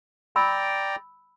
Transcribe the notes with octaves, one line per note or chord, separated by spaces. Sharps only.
D5 G5 A#5 B5 E6